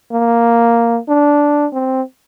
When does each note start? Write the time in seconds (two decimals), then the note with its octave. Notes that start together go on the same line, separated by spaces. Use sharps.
0.12 A#3
1.08 D4
1.73 C4